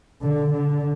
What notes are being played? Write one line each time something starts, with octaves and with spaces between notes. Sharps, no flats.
D3
D3